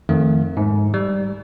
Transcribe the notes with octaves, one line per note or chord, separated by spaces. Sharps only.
F2 D#3 A3
G#2
G3